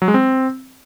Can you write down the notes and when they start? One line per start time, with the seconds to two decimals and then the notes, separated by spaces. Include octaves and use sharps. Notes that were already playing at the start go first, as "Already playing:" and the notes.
0.02 F#3
0.08 G#3
0.14 C4